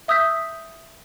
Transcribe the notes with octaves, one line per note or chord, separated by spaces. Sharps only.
E5 D#6 E6 G6 B6